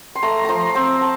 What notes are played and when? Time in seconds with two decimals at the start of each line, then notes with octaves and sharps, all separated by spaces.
0.15 C6
0.22 A3 A#5
0.45 F3 A#5 C6
0.75 C4 A#5
1.01 A5